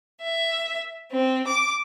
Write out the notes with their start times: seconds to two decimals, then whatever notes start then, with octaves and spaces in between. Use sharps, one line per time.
0.22 E5
1.12 C4
1.48 D6